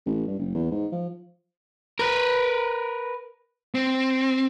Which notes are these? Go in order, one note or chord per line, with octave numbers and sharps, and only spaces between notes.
A1
G2
F#1
E2
G#2
F3
A#4 B4
C4